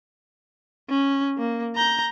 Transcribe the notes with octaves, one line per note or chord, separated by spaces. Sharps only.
C#4
A#3
A#5 G6